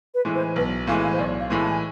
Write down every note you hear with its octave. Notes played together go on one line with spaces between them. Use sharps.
B4
A2 E3 G#3
C5
B1 B4
A2 E3 G#3 F5
F5
C5
B1 D5
F5
A2 E3 G#3
A5
G#5